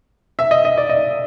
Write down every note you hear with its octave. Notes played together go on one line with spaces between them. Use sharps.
E5
D#5
D#5
D5
D#5